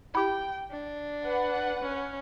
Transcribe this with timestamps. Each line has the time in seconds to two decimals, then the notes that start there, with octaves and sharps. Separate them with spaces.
0.15 E4 G4 G5
0.71 D4
1.25 B4 F#5
1.82 C#4